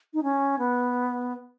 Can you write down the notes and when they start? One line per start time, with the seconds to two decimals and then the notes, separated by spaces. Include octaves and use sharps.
0.14 D#4
0.23 C#4
0.59 B3